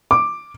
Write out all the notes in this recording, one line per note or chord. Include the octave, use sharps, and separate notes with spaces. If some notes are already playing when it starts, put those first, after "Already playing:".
D6